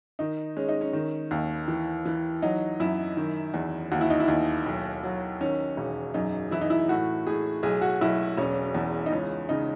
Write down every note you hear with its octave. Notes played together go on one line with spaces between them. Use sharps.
D#3 D#4
G#3 C#4
D#4
C#4
D#3
D#2
E3
E3
F#3 D#4
F#2 E4
D#3
E2
D#2 F#4
E4
D#4
E4
D#2
B1
F#3
D#3 C#4
E1
F#2 D#4
E3 E4
D#4
E4
A2 F#4
A2 G#4
B1 G#4
F#4
B1 E4
E1 C#4
E2
D#4
C#2 C#4
C#3 D#4